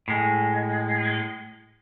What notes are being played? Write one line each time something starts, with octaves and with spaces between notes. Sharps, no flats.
A2 G#3